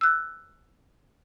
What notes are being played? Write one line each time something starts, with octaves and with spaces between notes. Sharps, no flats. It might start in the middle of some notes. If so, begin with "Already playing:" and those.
E6 F#6